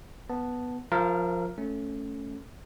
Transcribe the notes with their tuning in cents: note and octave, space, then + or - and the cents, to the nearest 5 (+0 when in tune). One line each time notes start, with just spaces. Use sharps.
B3 +0 A5 +0
F3 +10 A#4 +0 F5 -45
A3 +0 C#4 +0